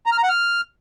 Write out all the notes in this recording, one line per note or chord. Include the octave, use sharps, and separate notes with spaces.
A#5
F6
A#5
F#5
F6